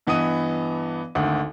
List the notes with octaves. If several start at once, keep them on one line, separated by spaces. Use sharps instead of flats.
G2 E3 B3 D#5 D#6 D#7
G#1 D2 F#5